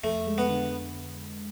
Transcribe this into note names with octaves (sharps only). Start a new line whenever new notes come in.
F2 A3
G#3
B3
D3